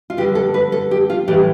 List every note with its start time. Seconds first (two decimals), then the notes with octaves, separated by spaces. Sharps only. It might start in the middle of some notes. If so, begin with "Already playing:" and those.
0.10 F4
0.17 G2 D3 G3 G4
0.35 A4
0.54 B4
0.72 A4
0.91 G4
1.10 F4
1.28 A2 E3 G3 G4